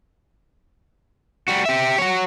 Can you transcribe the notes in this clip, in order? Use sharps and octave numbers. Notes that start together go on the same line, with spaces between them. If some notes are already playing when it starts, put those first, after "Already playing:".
G3 F#4
G4 E5
F#4 C#5